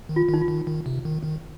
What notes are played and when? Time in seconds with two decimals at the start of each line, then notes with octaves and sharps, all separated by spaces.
0.09 D#3
0.16 F4
0.29 D#3 D#4
0.41 F4
0.48 D#3
0.67 D#3
0.86 C3
1.05 D#3
1.23 D#3